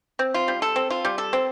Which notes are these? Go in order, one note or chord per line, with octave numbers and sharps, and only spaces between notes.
C4
F4
G3
A4
C4
F4
G3
A4
C4